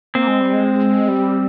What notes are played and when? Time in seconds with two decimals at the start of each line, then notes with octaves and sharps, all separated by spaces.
0.15 A#3 C4
0.28 G#3
0.40 G3
0.53 G#3
1.08 G3